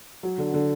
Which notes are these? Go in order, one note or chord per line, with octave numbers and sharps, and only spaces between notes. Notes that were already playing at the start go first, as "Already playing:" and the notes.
F#3
D3
D3